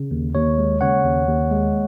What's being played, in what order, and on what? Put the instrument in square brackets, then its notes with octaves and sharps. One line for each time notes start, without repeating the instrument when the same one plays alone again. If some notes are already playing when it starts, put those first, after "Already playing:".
Already playing: [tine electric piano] C#3
D#2
D#2 C#5
G#3
C#3 C#5 F#5
D#2
D#2
G#3